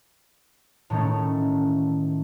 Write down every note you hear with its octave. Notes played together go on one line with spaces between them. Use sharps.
A2 D#3 A3 C#4